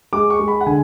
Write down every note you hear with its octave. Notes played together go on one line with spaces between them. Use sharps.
G#3 D6
C#6
G#3
B5
F#5
D3 G#5